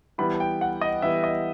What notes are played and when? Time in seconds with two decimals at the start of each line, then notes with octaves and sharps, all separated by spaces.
0.18 E3 G3 B3 E4 B5
0.40 G5
0.61 F#5
0.81 D#5
1.02 E3 G3 B3 E4 E5
1.24 D#5